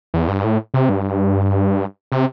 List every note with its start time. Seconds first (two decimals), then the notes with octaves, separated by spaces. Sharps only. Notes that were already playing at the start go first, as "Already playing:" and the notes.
0.14 E2
0.28 G2
0.44 A2
0.74 C3
0.89 G2
2.12 C3